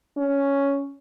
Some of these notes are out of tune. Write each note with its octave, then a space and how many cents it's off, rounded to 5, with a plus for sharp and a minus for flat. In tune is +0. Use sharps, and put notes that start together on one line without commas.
C#4 +5